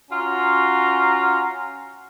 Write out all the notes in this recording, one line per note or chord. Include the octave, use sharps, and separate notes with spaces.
C#4 F4 F#4 A#5